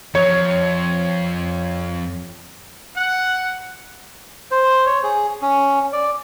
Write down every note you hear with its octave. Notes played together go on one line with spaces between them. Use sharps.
F2 F3 C#5
F#5
C5
C#5
G#4
C#4
D5